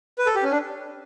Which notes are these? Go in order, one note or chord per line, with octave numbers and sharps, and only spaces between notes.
B4
A4
G4
C#4
D4